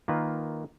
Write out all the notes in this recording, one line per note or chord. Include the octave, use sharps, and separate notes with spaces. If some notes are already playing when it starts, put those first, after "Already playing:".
D#3 A#3 F4 B4